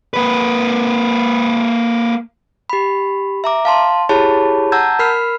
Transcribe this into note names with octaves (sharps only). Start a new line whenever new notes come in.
A#3 B4
G4 B5
E5 A#5 D6
F5 A5 C6
E4 G4 G#4 C#5 A5 B5
F#5 A5 A#5 E6 G6 G#6
A#4 B5 F6 C7